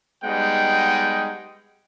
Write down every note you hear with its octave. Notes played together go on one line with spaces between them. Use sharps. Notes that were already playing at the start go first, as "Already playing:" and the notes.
G3 G#3 B3 D#4 F#5 G5